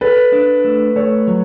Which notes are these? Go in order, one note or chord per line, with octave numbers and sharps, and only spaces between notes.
A4 B4
D4
A3
A3 C#5
F#3